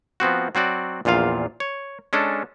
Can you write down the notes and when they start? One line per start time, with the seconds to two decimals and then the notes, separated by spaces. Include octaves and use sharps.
0.20 F3 B3 C4 F#4
0.55 F#3 C4 F#4 D5
1.05 A#1 E2 A#2 F4 F5
1.60 C#5
2.13 G#3 C#4 D4 A4